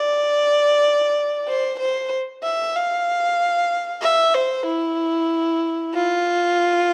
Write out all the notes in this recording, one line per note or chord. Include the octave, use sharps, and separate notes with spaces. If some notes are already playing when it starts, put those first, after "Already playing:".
Already playing: D5
C5
C5
E5
F5
E5
C5
E4
F4